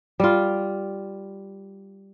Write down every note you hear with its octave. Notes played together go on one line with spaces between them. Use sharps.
G3 F4